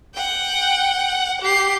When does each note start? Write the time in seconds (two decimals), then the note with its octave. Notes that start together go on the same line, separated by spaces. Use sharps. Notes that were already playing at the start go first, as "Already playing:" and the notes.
0.15 F#5 G5
1.42 G4 C7